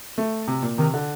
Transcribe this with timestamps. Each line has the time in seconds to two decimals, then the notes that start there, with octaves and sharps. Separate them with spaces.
0.18 A3
0.48 C3
0.63 A#2
0.78 C3 D#3
0.94 D3